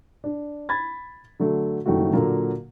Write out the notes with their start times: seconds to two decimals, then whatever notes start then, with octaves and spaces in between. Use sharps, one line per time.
0.24 D4
0.69 B5 G#6 A6
1.40 D3 F#3 A3
1.86 F#1 F#2 D#3 G3 A3 F#4
2.13 A#2 D3 F#3 A#3